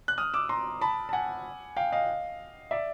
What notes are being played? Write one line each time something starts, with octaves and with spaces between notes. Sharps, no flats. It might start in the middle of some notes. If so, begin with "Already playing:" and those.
F#6
D#6 F6
D6 E6
A#5 C6
A5 B5
A5
F#5 G#5
F5 G5
D#5 F5
D5 E5